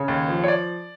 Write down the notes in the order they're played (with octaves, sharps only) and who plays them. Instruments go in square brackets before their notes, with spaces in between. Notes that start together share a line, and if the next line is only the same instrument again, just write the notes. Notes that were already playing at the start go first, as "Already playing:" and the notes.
Already playing: [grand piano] C#3 C#5
D#2
F3
C#5
D5